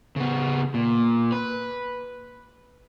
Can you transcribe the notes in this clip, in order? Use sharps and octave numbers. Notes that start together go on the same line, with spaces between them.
C#3 B3
A#2
B4